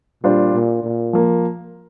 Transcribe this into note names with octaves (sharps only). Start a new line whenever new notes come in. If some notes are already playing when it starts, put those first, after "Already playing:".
A#2 G3 D4 F4 C5
A#2
A#2
F3 A#3